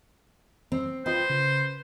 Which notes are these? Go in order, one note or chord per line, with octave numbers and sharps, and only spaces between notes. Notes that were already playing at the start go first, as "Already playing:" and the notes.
C4
F4 B4 C5 D#5 G5
C#3